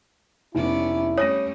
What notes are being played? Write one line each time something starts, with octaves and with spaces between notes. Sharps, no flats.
F1 B3 C#4 E4 D5
G3 A3 C#4 C#5 D#6 A#6 D#7